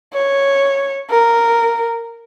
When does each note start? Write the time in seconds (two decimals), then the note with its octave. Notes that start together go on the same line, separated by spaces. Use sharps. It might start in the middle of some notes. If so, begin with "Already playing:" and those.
0.13 C#5
1.10 A#4